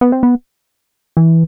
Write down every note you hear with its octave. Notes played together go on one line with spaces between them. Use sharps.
B3
C4
B3
E3